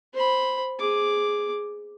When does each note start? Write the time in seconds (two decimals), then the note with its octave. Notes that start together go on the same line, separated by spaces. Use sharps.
0.14 C5 B5
0.79 G#4 D6